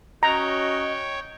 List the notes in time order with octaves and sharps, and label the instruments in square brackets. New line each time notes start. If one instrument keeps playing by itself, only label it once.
[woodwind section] C#4 F#4 D#5 [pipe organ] C#5 G5 [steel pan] A#5